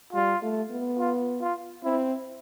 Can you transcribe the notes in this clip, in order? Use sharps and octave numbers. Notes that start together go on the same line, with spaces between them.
G3 F4
A3
B3
F4
F4
C4 E4